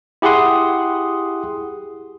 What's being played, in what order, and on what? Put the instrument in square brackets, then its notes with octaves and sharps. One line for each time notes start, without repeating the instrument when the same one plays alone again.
[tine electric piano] E4 G4 G#4 F#5 C6 D#6